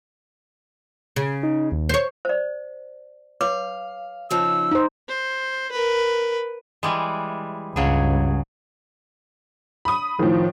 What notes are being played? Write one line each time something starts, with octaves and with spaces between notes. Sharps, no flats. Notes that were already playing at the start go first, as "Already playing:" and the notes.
C#3
D#4
D#2
C5 C#5
C5 D5
B4 C#5 F5 D6
C#3 F3 D#4 E6
D#4 C5
C5
A#4 B4
E3 G3 G#3
C#2 G2 C#3 F#3 G#4
B5 D#6
A2 D#3 F3